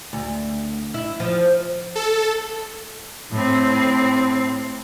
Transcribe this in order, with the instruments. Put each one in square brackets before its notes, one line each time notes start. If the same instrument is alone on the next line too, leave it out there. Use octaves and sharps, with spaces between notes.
[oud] D2
E4
F3
[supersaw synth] A4
[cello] A2 C4